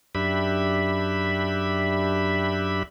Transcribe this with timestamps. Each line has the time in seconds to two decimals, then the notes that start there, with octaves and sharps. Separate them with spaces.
0.15 F#2 D4 G4 E5 B5